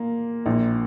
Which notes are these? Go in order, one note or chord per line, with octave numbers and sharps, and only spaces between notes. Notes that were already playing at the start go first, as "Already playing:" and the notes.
Already playing: A#2 A#3
A#1 A#2